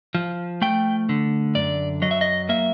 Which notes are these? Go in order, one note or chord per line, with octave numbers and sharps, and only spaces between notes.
F3
A3 G5
D3
F#2 D5
F#3 D#5
E5
D#5
A#3 E5